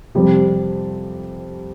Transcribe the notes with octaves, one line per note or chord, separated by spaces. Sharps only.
F2 C3 G3 C4 G4